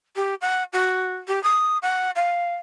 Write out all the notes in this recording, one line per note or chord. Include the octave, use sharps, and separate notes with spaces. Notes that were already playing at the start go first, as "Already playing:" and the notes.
G4
F#5
F#4
G4
D#6
F#5
F5